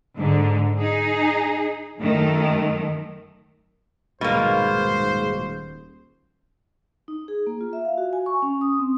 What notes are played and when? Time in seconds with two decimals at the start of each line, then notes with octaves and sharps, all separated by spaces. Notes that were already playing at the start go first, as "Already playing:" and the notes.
0.16 G#2 D3
0.79 D#4 G#4
1.99 F#2 D#3 A3
4.21 D#1 G#2 B2 A#3 C5
7.08 D#4
7.28 G#4
7.47 A#3
7.61 F4
7.73 E5
7.85 F5
7.98 F#4
8.13 G#5
8.26 C#6
8.42 C#4
8.61 D#6
8.79 C4